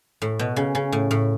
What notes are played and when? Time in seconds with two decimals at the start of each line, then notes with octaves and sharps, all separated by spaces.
0.22 A2
0.39 B2
0.56 C#3
0.75 C#3
0.92 A2
1.11 A2